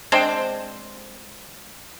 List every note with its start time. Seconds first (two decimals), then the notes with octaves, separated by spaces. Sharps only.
0.12 G#3 C4 D4 C5